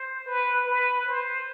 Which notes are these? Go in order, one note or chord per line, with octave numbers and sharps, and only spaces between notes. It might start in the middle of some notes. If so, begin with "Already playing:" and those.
Already playing: C5
B4
B4
C5